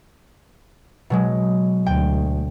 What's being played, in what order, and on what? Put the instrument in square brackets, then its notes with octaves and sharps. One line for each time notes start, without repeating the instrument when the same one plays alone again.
[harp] B2 F#3 G#3
[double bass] D2 [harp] G5